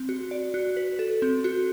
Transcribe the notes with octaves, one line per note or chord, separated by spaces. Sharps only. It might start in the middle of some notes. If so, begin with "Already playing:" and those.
Already playing: C4
F#4
D5
F#4
B4
A4
C4
F#4